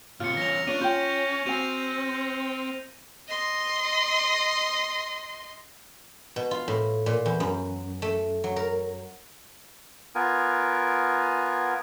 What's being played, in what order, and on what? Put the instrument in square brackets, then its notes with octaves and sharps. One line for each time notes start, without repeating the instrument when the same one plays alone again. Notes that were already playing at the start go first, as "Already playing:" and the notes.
[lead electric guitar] A2 C3 [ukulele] F4 [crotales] F6 C#7
[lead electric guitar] E2 C#4 [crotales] A#6 F7
[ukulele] C#4 F4 C#5 [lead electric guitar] D4 [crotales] D#7
[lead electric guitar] C#4 [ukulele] F4 G5 [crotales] G6
[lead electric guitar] C4 [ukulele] F#4 G#5 [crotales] D#7 F7
[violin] D#5 C6
[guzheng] B2
F4
A2
A#2
E2
F#2
A3
F#3
A#4
[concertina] B3 F4 A#4 G#5